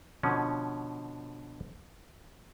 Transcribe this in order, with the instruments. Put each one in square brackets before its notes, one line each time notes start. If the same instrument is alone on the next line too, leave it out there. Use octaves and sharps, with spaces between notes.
[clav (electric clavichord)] B2 D3 F3 C#4